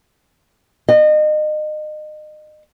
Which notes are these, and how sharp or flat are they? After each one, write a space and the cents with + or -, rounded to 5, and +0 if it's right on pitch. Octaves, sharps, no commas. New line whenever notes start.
D#5 -30